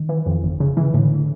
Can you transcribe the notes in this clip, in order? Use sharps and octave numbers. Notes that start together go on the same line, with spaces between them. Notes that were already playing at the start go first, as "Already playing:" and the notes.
Already playing: D#3
E3
F2
G1
C#3
E3
C#3
A2 D3